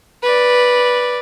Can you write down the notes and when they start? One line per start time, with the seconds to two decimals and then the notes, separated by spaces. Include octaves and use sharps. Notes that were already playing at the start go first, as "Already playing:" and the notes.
0.23 B4 D5